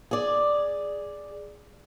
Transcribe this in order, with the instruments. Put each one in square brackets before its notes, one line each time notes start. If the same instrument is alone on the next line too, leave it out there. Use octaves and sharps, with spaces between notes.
[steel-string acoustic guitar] G#4 D5